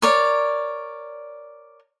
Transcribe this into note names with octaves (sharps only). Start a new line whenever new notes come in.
A#4 C#5 D5